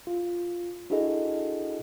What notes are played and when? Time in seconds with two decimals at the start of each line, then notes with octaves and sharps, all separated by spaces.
0.07 F4
0.90 D4 E4 F#4 G#4 A4 D#5